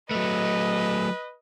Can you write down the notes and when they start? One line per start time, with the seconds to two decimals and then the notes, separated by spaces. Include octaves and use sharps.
0.11 F#3 A3 B4 D#5